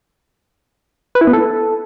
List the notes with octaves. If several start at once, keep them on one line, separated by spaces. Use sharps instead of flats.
B4
E4
B3
A4